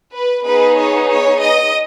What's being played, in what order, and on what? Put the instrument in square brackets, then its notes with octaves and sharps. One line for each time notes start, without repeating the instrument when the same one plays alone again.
[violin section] B4
B3 D#4 G#4 B4
C#5
C#5
D#5